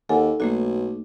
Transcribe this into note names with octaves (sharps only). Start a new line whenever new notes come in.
D#2 A4 F#5 G#5
B1 A3 A#3 F#4